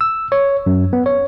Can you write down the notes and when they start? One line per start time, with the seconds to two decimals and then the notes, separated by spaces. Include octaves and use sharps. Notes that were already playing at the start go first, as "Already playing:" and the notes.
0.01 E6
0.32 C#5
0.66 F#2
0.93 B3
1.06 C#5